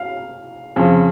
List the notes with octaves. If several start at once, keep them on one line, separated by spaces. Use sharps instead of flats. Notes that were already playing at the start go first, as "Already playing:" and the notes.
Already playing: F5
F2 C#3 F3